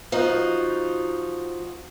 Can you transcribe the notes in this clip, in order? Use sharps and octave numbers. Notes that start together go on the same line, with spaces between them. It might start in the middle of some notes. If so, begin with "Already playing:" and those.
F3 D#4 F#4